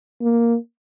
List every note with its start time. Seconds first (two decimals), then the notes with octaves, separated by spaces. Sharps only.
0.21 A#3